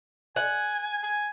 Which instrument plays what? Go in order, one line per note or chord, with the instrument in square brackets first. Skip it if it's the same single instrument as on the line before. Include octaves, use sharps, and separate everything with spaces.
[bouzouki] F#5 [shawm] G#5
[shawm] G#5